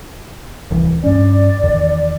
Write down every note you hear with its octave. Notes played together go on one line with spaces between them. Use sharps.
D1 C2 E3
G2 C#4 D5
E2 D#3